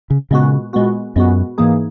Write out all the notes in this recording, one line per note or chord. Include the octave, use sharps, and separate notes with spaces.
C#3
A#2 C#3 G#3 B3 F#4
A#2 G#3 B3 F#4
F#2 A#2 G#3 B3 F#4
G#2 E3 A#3 D#4 G#4